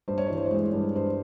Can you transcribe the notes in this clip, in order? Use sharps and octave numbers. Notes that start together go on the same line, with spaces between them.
G2 C5
C#5
C5
E3
C5
C#5
G#3 C5
G2
G2 C5